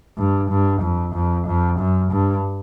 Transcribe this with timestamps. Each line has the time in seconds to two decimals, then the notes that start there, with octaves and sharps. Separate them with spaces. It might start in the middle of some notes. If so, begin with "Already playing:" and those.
0.18 G2
0.50 G2
0.82 F2
1.14 F2
1.47 F2
1.79 F#2
2.12 G2